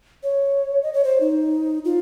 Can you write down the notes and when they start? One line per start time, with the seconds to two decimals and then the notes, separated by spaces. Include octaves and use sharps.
0.23 C#5
0.83 D#5
0.94 C#5
1.04 C5
1.21 D#4
1.85 F4